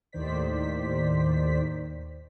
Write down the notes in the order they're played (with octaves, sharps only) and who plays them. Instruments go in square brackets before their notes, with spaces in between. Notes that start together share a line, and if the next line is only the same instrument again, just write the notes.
[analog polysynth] D#2 A2 D#3 C5 D5 B6